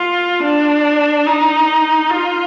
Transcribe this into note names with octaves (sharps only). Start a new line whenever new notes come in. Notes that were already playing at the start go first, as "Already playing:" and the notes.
Already playing: F4
D4
D#4
F4